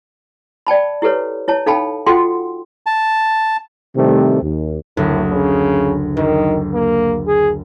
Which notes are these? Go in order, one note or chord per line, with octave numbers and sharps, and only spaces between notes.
D5 G5 A5 B5
E4 G4 A4 B4 C#5
E4 C#5 A5
D#4 A4 F5 G5 A5 B5
F4 F#4 A4 F#5 G5 C6
A5
A2 C3 D#3 G3 A3 C4
D#2
F#1 D2 A2
C#3
F#1 D#3
A#3
G#4